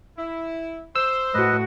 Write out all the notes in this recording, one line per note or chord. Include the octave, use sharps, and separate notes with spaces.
E4
C5 E6
A2 F#4 B4 D#5